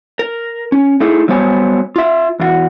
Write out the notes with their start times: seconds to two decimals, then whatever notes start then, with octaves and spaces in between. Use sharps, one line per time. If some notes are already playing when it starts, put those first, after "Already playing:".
0.19 A#4
0.72 C#4
1.00 A3 D#4 E4 G#4
1.28 F#3 G3 B3 C5 C#5 G#5
1.96 F4 E5
2.40 E2 F4 F#4